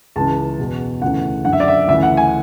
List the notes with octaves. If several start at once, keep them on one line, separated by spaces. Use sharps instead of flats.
C#2 C#3 E3 A5
E2 B2
D2 C#3 E3 F#5
F#2 D3 F#5
E5
D5
E5
D2 C#3 E3 E5
F#5
G#5